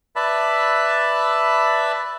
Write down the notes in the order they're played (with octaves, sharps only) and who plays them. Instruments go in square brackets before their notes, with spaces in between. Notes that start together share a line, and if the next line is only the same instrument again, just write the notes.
[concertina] B4 D5 E5 A5 B5